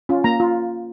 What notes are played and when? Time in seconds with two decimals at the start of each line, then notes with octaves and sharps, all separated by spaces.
0.09 C#4 F4
0.24 A#3 A#5
0.40 F4